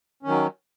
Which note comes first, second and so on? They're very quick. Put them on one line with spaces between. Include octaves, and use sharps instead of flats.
C#4 D#3 F#3